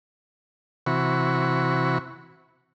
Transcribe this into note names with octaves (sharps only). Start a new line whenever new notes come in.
C3 E3 F#4 B5 C#6